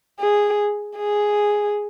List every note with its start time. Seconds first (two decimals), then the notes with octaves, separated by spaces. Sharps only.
0.20 G#4
0.98 G#4